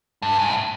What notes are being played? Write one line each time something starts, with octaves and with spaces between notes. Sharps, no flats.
G2
G#2
A2